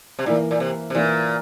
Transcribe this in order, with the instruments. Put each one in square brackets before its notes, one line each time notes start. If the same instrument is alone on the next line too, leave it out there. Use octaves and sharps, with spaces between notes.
[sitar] C3
[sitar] A#2 [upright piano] E3 A#3 E4
[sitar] A#2
C3
C3
[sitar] A#2 [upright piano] E3 A#3 E4